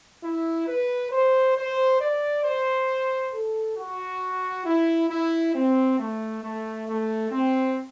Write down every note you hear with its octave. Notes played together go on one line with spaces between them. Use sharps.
E4
B4
C5
C5
D5
C5
A4
F#4
E4
E4
C4
A3
A3
A3
C4